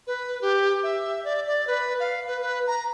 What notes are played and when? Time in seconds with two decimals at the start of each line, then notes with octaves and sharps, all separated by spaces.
0.07 B4
0.41 G4
0.83 E5
1.24 D5
1.47 D5
1.67 B4
2.00 F5
2.27 B4
2.42 B4
2.67 A#5